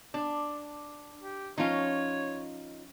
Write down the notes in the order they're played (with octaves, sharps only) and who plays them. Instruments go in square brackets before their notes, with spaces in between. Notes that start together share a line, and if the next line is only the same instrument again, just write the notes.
[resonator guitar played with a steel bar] D4 [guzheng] A5
[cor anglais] G4
[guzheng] F3 C#4 [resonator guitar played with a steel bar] D#4 F4 [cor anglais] C#5